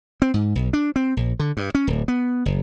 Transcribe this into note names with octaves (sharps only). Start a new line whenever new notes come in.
C4
G#2
B1
D4
C4
A#1
D3
G2
C#4
D1
B3
F#1